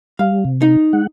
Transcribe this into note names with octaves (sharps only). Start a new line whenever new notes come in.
G3 F5
C3
D#4
G#3 F#5